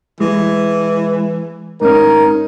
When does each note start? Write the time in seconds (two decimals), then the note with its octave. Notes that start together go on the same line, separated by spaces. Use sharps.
0.20 E3 G#3
1.81 G#2 C#4 D#4 A#4